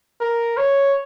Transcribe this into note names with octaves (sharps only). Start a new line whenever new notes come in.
A#4
C#5